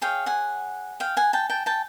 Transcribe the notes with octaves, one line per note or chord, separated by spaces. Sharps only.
G#4 C#5 F5 G5
F#5 G#5
F5 G5
F#5 G#5
G5 A5
G5 A5
G5 A5